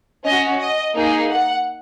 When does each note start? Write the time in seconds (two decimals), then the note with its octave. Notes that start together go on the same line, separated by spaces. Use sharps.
0.25 C#4 F#4 D#5
0.60 D#5
0.95 A#3 D#4 G#4
1.30 F#5